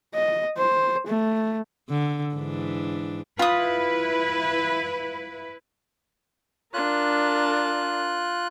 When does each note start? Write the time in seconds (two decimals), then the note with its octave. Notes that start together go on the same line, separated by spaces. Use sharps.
0.15 D#5
0.58 C5
1.07 A3
1.90 D3
2.35 G#2 E3 D4
3.39 E4 F4 B4 D#6
6.74 D4 F4 A#4 F#6